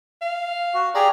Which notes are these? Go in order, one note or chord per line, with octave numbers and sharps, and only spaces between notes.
F5
F#4
G4 G#4 D5 A#5